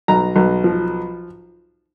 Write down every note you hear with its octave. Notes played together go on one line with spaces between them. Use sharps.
B1 A#5
B1
F3